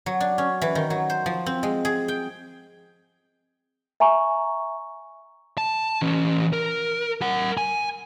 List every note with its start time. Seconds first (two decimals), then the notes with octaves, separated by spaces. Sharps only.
0.06 F#3
0.20 D4
0.38 C#4
0.62 E3
0.75 D#3
0.90 F#3
1.10 C5
1.26 F3
1.46 C4
1.63 G#3
1.85 G#4
2.08 G5
4.00 E5 G#5 A#5 C#6
5.58 A5
6.02 E3 C#4
6.53 A#4
7.22 A#4 F#5
7.57 G#5